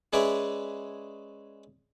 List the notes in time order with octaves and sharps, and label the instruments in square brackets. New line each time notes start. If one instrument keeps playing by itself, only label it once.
[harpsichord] G#3 C#4 G#4 B4 D5 E5